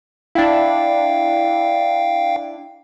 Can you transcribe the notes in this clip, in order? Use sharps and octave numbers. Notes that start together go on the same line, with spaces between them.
D4 E4 F5 G5